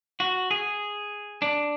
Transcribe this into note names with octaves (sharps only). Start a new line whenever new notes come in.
F#4
G#4
D4